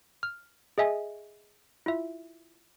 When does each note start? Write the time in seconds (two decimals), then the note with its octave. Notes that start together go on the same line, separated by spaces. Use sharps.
0.23 F6
0.78 G#4 D#5 E5 G#5
1.86 E4 F4 E5